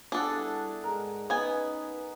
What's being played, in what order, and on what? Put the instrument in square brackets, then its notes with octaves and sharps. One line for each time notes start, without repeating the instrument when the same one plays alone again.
[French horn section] G3 B3 E4 [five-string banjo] D4 A4 [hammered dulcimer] G#4 F#5
[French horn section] G#2 G#3 G#4 [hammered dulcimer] A#4
[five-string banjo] B3 G#5 [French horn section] C#4 D#4 B4 [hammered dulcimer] D#5